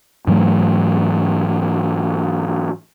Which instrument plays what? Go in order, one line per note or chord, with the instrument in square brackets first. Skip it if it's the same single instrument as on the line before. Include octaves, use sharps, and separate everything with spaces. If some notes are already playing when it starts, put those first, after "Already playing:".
[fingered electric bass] G#2 E3 F#3 A3